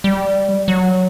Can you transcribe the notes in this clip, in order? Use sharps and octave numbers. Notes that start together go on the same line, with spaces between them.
G3
F#3